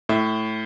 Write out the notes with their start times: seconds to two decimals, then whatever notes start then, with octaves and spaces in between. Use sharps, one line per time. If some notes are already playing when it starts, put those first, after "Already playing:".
0.09 A2 E5